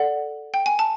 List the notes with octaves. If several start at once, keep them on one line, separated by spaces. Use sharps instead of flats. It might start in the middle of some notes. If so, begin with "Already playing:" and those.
Already playing: A4 D5 F#5
G5
G#5
A5